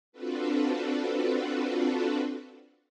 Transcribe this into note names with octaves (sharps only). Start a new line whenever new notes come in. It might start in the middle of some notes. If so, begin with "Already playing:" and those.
C4 D4 F4 F#4 A4 B4